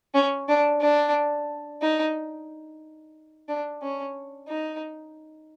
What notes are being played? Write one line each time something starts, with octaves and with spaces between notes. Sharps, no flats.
C#4
D4
D4
D#4
D4
C#4
D#4